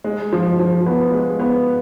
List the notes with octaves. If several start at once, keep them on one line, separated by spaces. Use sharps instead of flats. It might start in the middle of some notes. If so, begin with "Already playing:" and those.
G#3
F3
F3
B3
G#3
B3